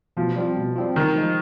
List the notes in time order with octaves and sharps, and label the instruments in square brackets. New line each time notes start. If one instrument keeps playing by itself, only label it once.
[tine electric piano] B2 [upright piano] F3
[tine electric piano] G3 C4 F4
B2
G3 C4 F4
[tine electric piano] C3 [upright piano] D#3
[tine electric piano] F3 G#3